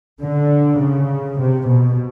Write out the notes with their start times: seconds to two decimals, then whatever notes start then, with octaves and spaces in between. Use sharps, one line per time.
0.21 D3
0.81 C#3
1.39 C3
1.69 B2